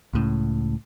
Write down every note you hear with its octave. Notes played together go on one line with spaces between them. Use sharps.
C#2 A2 C#3